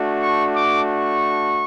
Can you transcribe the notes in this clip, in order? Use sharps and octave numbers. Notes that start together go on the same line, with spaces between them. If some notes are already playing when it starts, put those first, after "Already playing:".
Already playing: A3 D4 F#4
C#6
D6
C#6